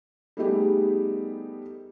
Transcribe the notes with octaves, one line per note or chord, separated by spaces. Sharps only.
G3 A3 B3 D#4 G4 G#4